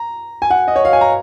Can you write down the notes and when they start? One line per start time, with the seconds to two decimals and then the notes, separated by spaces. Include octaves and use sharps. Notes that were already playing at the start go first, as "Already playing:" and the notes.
Already playing: A#5
0.42 G#5
0.50 F#5
0.68 D#5
0.76 C#5
0.85 F5
0.93 G#5
1.01 A#5